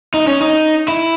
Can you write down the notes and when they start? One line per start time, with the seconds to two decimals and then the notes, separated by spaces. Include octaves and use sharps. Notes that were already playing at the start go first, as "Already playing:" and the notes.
0.14 D#4
0.27 C#4
0.41 D#4
0.88 E4